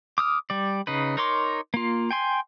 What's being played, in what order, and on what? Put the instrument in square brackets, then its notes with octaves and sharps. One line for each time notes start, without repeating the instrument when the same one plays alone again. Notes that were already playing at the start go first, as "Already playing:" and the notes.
[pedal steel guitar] D6 D#6 F6
G3 D5
C#3 D#4 B4
D#4 A#4 C#5 C6 D6
A#3 F4
G5 G#5 C6